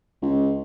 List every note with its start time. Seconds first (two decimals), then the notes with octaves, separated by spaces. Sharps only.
0.22 C#2